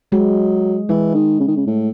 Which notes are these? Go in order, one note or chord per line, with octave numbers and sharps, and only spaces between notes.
F#3 G#3
E3 G#3
D#3
C#3
D#3
C#3
A2